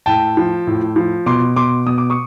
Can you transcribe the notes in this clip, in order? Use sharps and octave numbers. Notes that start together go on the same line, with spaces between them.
A2 G5 A5
F3
A2
F3
B2 C6 D6
B2 C6 D6
B2 D#6
D6
C#6 D#6